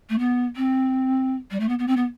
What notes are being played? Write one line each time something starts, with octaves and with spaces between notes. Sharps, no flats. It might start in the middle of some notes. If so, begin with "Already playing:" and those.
A3
B3
C4
G3
A3
B3
B3
C4
B3